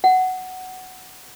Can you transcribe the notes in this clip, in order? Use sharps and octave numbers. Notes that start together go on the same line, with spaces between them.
F#5